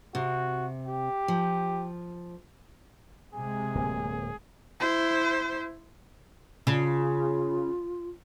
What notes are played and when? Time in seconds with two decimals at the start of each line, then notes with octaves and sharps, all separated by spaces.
0.15 C3 F#4
0.87 G4
1.28 F3
3.34 C3 G#3 G#4 G#5
3.75 D1 A#3
4.80 E4 C5
6.67 C#3 F4